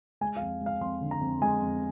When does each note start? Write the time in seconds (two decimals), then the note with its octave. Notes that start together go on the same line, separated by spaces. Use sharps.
0.21 G#3 G#5
0.37 F5
0.41 F2
0.61 G#3
0.66 F5
0.81 F2 C6
1.01 D3
1.11 A#5
1.21 F2
1.42 G#3 G#5
1.61 F2